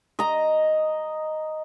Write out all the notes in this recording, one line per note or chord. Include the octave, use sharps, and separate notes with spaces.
D#5 A#5